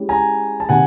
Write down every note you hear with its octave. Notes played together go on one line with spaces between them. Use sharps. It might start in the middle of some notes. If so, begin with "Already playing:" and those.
Already playing: G#3 C#4 E4 G4
G#5 A#5
A5
C3 D#3 F#5 G#5